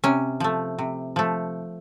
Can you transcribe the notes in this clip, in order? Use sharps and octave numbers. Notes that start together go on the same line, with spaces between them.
C3 C#4
F3 A3
C3
F3 A3